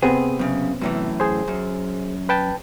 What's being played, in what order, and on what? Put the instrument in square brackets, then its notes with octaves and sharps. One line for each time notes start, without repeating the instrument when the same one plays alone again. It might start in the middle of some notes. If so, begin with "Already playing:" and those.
[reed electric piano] C3 B3 C4 [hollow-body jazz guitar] G#4
[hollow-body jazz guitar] F#2 C#3
F#2 A2 E3
[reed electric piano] G#4 C5
[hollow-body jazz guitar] F#2
[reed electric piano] B4 G5 A5